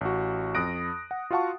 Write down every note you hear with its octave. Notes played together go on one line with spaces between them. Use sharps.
A1 F#4
F2 D#6 F#6 A#6 D7
F#5
F4 F#4 F5 F#5 A5 C#6